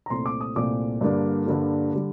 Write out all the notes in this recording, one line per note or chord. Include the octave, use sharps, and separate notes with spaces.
A#5
C2 A#2 A3 C4 C6
D6
D#6
C2 A#2 A3 C4 D6
G2 D3 G3 A#3 D4
G2 D3 G3 A#3 D4
D3 G3